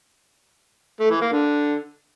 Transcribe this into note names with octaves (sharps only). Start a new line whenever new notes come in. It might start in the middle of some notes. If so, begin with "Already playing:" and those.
A3
E3
A#3
D3